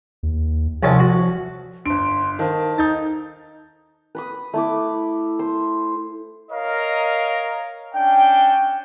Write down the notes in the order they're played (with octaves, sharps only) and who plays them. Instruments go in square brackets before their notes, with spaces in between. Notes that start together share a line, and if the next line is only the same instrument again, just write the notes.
[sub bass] D#2
[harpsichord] C2 C#4 A5 [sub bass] F3
[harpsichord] F#4
[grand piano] G1 D7 [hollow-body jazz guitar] D4 [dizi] C6
[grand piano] D#3 [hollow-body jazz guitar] A4 C5 F5 [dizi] A5
[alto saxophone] D#4 [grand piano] G6 A6
[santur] B4 B5 D#6
A3 E4 D6
C5
[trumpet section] A#4 C#5 D#5 F5 A#5
C#4 D4 G5